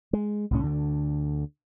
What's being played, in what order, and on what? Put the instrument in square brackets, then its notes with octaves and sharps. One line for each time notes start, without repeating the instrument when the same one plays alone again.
[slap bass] G#3
C2 A2 C#4
D2 D3